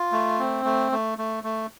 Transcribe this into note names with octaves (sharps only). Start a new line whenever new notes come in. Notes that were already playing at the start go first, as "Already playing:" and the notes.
Already playing: F4
A3
C4
A3
A3
A3
A3